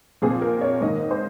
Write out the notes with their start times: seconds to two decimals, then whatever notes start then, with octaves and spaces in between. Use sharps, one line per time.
0.22 A#2 F3 C4 G#4
0.42 A#4
0.61 C#5
0.81 G#2 D#3 A#3 D#5
1.11 C5